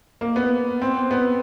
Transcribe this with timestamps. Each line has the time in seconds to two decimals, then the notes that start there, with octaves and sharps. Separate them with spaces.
0.21 A#3
0.36 B3
0.82 C4
1.11 B3